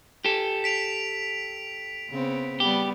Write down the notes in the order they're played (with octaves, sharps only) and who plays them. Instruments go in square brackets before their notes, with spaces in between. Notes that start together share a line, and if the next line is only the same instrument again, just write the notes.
[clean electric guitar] G4 A4
[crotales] B6 D7 F7
[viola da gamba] C#3 B3 C4
[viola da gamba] G3 B3 [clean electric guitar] G4